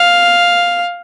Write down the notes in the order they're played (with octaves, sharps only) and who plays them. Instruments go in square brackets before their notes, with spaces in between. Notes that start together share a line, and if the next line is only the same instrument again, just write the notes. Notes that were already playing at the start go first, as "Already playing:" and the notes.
Already playing: [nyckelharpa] F5